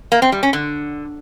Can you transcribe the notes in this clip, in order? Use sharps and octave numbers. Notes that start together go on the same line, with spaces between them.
A#3
C4
G3
C#4
D3